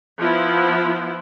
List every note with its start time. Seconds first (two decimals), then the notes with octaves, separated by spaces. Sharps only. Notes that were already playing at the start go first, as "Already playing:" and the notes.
0.20 F3 B3 E4